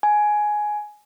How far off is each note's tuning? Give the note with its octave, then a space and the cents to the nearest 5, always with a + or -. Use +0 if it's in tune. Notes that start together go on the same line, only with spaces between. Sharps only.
G#5 +10